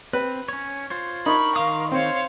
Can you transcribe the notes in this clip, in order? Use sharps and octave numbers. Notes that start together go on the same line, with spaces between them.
C4 B4
C#4 C#5
F4 C5 C#5
D#4 A#4 B5 C#6
D#3 F5 C6 D#6
C4 C5 C#5 F5